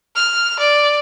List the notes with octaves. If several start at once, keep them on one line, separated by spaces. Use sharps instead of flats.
F6
D5